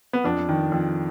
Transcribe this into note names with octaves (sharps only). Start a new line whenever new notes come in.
B3
F2 D4
D#3
F2